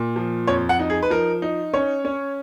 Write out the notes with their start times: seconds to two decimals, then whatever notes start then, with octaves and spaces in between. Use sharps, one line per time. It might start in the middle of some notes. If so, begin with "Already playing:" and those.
Already playing: A#2
0.16 F3
0.47 F2 C#5
0.69 F#5
0.79 D#4
0.90 G#4
1.03 B4
1.10 F3 A#4
1.42 D#4
1.73 C#4 C#5
2.05 C#4